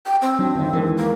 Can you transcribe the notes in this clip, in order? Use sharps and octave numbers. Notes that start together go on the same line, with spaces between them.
G5
C4
F#3 D4
G1 D#3
D#2 E3 G#3 A#4
A#3